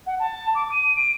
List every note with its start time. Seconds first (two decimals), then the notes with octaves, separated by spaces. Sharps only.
0.06 F#5
0.19 A5
0.54 D6
0.71 D#7
0.96 D7